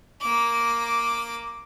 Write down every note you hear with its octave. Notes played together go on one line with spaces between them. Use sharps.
A#3 D6